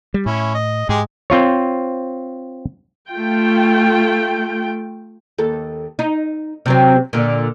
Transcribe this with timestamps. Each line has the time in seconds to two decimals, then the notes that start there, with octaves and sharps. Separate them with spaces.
0.14 G3
0.26 A2 C#4 E4
0.54 D#5
0.89 G#2 G#3 G4 G#4
1.30 C4 F4 C#5
3.11 A3 F4 G5
5.38 D#2 A4
5.99 D#4
6.66 C3 F#3 C4
7.13 A#2 D3